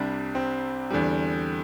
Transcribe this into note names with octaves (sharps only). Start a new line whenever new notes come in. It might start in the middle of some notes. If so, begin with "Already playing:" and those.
Already playing: C2 C3 G3 D4
C4
E2 D3 G3